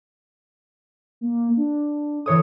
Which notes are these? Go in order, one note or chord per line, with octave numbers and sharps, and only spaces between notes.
A#3
D4
E3 A4 C#5 D#6